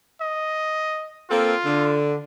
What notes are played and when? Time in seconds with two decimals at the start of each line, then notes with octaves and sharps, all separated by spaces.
0.21 D#5
1.30 A#3 C4 F4 A4
1.64 D3